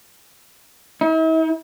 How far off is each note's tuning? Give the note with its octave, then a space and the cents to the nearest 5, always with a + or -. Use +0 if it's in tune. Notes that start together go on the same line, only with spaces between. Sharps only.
E4 -45